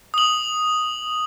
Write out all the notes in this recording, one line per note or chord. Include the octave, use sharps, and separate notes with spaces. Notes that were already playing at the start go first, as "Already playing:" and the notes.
D#6 F#7